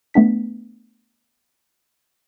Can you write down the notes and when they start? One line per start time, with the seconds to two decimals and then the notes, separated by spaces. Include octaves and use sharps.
0.14 A3 B3 D4 B6